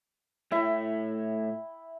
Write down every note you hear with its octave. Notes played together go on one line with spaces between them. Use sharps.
A2 E4 C#5 E5 G5